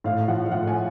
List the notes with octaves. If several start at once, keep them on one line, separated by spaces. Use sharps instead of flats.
A2 F5
F3 F#5
F5
A2 F#5
G#5